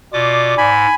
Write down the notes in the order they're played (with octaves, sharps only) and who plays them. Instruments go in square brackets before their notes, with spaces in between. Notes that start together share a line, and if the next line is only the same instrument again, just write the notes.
[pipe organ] B2 F4 D6 [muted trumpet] D5
[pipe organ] G#2 [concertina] G#5 B5